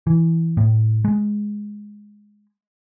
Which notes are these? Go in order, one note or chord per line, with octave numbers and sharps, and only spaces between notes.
E3
A2
G#3